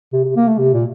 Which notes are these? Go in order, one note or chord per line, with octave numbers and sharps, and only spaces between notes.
C3
C3
A#3
A3
C3
A#2